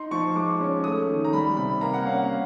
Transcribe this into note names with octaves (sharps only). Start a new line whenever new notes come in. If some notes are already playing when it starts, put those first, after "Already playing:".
Already playing: D#4 C6
F3 C#6
G#3 D6
C#4
A3 D#6
D#3
A#5
G3 B5
C3 B5
A#3 A#5
F#5
C#4 F5
F#5